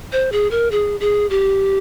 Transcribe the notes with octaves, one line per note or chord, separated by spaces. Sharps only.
C5
G#4
A#4
G#4
G#4
G4